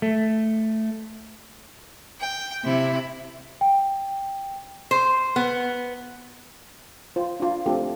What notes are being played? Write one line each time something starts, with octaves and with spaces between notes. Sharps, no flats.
A3
G5
C3 E4
G5
C5
B3
F4 C5
D4 F4
A3 C4 D4 F4 G4 A4